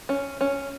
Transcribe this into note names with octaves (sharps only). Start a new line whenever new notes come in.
C#4
C#4